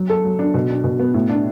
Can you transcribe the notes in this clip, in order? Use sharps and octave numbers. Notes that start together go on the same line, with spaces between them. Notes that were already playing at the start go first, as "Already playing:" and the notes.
Already playing: F#3
A4
F#3
D4
B2
D4
B2
B3
A2
D4